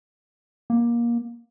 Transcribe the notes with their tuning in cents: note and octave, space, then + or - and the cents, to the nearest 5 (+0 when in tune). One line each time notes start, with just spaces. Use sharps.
A#3 +20